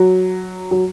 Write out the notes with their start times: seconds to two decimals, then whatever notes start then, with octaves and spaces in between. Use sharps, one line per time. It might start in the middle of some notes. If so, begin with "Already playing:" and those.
Already playing: F#3
0.71 F#3